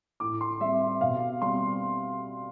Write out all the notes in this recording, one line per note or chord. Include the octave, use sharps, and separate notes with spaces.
A2 D6
C6
G3 C4 E5
E5
B2 F5
G3 C4 C6